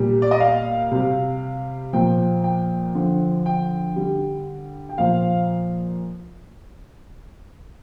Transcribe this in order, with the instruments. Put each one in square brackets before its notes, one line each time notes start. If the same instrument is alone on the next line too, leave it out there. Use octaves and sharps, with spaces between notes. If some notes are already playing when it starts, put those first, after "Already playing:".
Already playing: [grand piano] A#2 G3
D5
D#5
F5
C3 G3
A#2 F3 G5
G5
D3 F3
G5
D3 G3
G5
A#2 F3 F5